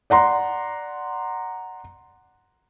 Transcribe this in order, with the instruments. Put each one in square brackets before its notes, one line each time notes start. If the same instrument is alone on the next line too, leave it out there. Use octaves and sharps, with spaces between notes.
[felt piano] D5 F#5 A#5 C6